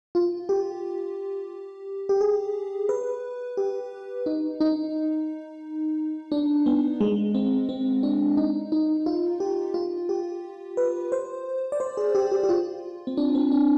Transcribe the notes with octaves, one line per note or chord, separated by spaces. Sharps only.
F4
G4
G4
G#4
B4
G4
D#4
D#4
D4
B3
G#3
C4
C4
D4
D#4
D#4
F4
G4
F4
G4
B4
C5
D5
C5
G#4
G4
G4
G4
F4
C4
D4
C4
D4